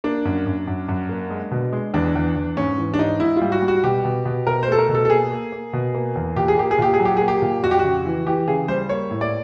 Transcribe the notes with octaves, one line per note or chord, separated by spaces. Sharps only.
A#3 D4
F#2
F#2
F#2
F#2
A#3
G#3
B2
G#3
E2 D4
E2
E2
G#2 C#4
E3
D4
G#2 D#4
G#2 E4
G3 F4
F#4
G3
F#4
B2 G4
B2
B2
B2 A#4
C5
A3 A4
A#4
B2
A4
A4
A#3 G#4
A#3
A#3
B2
A#3
E2
A#2 G4
G#4
A#3 G4
G#4
A#2 G4
G#4
F#3
G4
A#3 G#4
G4
A#2
F2 F#4
G4
F#4
C#3
E3
E3 G4
C#3 G#4
G3 C5
A#3 C#5
A2
D5